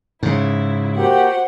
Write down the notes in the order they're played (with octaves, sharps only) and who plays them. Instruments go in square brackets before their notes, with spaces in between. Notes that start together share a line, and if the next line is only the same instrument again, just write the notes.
[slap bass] G#2 C#3 [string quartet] E4
[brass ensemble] A#3 F#4 G4 [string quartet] C5 F#5